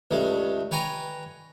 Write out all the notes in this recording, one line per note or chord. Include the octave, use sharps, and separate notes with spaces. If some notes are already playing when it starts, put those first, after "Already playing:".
C#2 G2 A3
B4 C#5 G5 G#5 A#5